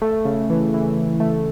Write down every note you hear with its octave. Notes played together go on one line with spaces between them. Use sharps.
A3
C#3
E3
E3
E3
A3